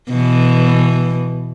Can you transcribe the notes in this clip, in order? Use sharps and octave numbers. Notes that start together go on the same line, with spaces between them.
B2 E3